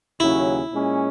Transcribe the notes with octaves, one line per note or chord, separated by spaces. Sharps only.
D#2 C#3 F#3 C#4 E4
A#2 G#3 C#4